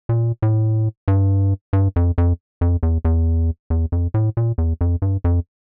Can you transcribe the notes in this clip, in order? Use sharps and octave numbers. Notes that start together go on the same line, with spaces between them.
A#2
A2
G2
G2
F2
F2
F2
E2
E2
E2
F2
A2
A#2
E2
F2
G2
F2